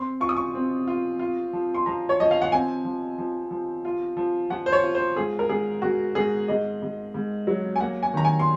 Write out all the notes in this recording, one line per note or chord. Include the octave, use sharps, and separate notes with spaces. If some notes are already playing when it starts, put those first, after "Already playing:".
Already playing: C4 C6
F4 C#6
D#6
C#6
C4
F4
F4
F3
C6
F3 A#5
C#5
F3 D#5
F5
F#5
C4 G#5
F3
F3
F3
F4
F3
F3 F#5
C5
C#5
F4
C5
G#2 G#4
A#4
G#2 G#4
G#2 F#4
G#2 G#4
G#2 D#5
G#2
G#2
F#3
G#5
A#3 F#5
G#5
D#3 A#5
G#5
C6